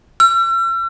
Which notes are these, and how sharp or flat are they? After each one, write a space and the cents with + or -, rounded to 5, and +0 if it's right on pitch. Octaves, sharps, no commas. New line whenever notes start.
E6 +45